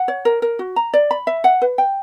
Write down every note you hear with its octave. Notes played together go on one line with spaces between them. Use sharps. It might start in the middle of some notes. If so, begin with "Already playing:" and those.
Already playing: F#5
C#5
A#4
A#4
F#4
A#5
D5
B5
E5
F#5
B4
G5